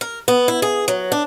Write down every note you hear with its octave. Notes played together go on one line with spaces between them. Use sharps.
A#4
B3
E4
G#4
F#3
D4